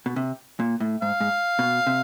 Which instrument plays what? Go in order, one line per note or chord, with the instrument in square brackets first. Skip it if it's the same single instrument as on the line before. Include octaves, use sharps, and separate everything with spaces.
[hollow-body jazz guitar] B2
C3
A#2
A2
[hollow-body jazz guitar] G#2 [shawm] F5
[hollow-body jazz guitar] G#2
B2
C3